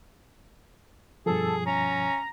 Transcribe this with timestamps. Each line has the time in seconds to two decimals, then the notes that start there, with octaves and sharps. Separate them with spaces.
1.26 G2 B2 F3 G#4 A4
1.66 C#4 A#5